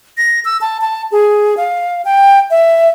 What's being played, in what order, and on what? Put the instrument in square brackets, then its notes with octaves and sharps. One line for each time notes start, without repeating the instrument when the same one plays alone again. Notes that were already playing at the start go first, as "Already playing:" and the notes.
[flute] A#6
E6
A5
A5
G#4
F5
G5
E5